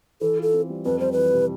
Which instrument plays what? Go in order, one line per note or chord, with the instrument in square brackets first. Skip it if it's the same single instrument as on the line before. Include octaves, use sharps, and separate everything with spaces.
[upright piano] E3 [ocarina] A4
[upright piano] F4 [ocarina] A4
[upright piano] C4
G3
[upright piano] F2 [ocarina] B4
[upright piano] G3 [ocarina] C5
[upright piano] E3 [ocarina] B4
[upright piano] C3